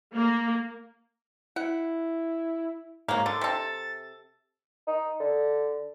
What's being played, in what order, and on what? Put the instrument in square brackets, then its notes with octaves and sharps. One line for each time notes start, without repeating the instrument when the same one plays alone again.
[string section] A#3
[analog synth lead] E4 [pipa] F#5
[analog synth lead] G#2 [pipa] F#3 A#3
[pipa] D3 [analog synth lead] A6
[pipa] C3 A4
[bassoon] D#4
D3